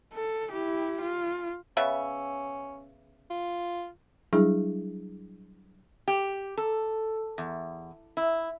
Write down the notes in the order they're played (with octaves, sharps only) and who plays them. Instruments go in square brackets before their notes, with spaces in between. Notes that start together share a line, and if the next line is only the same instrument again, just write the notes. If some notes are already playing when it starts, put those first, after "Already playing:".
[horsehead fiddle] A4
E4 G4
F4
[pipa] C#3 B3 E5 [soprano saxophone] C#4
[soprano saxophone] F4
[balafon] F#3 G3 D4 E4 G#4
[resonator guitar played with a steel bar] G4
A4
E2
E4